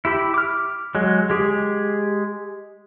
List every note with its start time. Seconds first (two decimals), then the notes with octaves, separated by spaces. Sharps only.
0.05 E4 G4 B5
0.34 D6 F6
0.95 F#3 G#3
1.29 G#3 G4 G#4